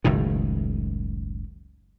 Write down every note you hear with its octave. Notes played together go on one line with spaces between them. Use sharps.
F#1 C#2 A2 D#3